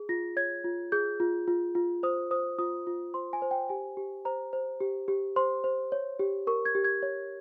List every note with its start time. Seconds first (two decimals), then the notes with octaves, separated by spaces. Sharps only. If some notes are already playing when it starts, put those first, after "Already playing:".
Already playing: G#4
0.09 F4 A#6
0.37 C#5 G#6
0.64 F4
0.92 G#4 G6
1.20 F4
1.48 F4
1.75 F4
2.03 C5 D#6
2.31 C5 D#6
2.59 F4 D#6
2.87 F4
3.14 C5 C6
3.33 G#5
3.42 C5
3.51 G5
3.69 G4 G#5
3.97 G4
4.25 C5 A#5
4.53 C5
4.80 G4
5.08 G4
5.36 C5 C6
5.64 C5
5.92 C#5
6.19 G4
6.47 A#4 C#6
6.65 G#6
6.75 G4
6.85 G#6
7.03 C#5